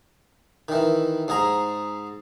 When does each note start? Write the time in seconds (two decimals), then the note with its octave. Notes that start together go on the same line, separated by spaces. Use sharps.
0.69 D#3 E3
1.28 G#2 G#4 A#5